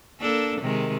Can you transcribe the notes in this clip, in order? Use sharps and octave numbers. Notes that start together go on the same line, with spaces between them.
A#3 D4 A4
C3 D#3 G#3